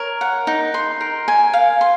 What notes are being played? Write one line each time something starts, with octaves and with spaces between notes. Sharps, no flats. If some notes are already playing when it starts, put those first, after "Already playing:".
Already playing: A#4 C#5
F#5
D#4
C6
A#4
G#5
F5
C6